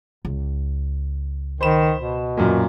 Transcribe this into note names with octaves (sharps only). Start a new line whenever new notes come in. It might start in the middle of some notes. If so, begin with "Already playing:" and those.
C#2
D#3 C5 B5 E7
B2
F#2 A#2